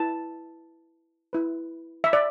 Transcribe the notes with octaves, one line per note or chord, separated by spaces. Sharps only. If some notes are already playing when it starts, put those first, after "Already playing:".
Already playing: E4 B4 A5
E4 B4
E5
D5